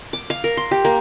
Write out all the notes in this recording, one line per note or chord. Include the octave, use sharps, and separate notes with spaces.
D6
F5
A#4
C6
G4
A#3